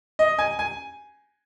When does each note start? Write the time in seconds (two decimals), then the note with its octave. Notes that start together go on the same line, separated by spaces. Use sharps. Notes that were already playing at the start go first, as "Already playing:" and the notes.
0.19 D#5
0.39 G#5
0.59 G#5